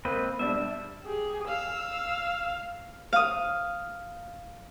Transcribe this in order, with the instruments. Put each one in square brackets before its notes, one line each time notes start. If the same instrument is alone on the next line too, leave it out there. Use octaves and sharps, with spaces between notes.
[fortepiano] A#3 [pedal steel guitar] C4 B4 D#5
[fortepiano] B2 G3 D4 [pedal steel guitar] E5
[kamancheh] G4 G#4
[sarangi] F5 [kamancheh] E6
[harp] F5 D#6